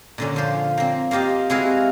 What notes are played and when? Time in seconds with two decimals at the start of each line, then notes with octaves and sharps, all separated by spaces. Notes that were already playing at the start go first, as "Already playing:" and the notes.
0.18 A#2 D3 C#4
0.36 F3 C5
0.77 A#3 C4
1.11 A#3 F4 G4 D#5 F5
1.50 C3 G#3 E4 F#4 F5 G#5